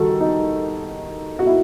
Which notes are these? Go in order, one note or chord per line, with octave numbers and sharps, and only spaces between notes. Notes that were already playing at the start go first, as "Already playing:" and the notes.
Already playing: D#3 G3 F#4 A4
D#4
F#4
E4